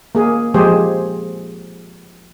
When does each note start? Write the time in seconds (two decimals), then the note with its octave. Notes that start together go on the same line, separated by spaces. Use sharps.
0.15 A#3 G#4
0.54 F3 G#3 G4 G#4 C5